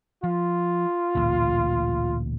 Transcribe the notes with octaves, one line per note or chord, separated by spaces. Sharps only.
F3 F4
A1 D2 A#2